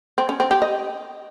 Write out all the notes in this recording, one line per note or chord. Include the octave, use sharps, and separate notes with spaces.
C4
C#4
C4
G4
D#5